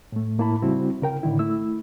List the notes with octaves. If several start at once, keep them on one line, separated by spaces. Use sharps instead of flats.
A2 A3
A2 A#3 E4 A5 B5
C#3 G3 C4 E4 F#4
C#3 A#4 G5
A2 D3 D#3 E4
A3 E4 E6